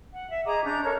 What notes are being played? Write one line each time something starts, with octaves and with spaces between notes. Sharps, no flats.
F#5
E5
G#4 D#5 A#5 D6
C#4 D4 A#5 G6
A4 A#4 C#5